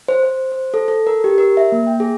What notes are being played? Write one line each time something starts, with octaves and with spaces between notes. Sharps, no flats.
C5
C5
C5
A4
A4
A#4
G4
A#4
E5
A#3
G5
G#4